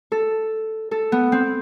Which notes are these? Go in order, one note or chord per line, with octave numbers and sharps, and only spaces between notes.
A4
A4
B3
C4